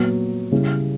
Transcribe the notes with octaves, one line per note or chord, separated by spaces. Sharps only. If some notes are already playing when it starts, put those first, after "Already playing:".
Already playing: A#2 F#3 B3
C#3 G3 C#4 E4